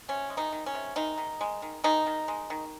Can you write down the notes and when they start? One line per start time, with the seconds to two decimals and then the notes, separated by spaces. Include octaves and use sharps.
0.08 C3 C#4
0.30 G#3
0.37 D#3 D#4
0.52 D#3
0.66 C#4
0.74 C3
0.96 D#3 G#3 D#4
1.18 D#3
1.41 G#3
1.62 D#3
1.84 D#3 G#3 D#4
2.07 D#3
2.28 G#3
2.50 D#3